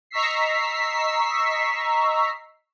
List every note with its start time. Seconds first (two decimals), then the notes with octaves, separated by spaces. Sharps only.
0.11 D#5 A#5 C#6 E6 B6 C7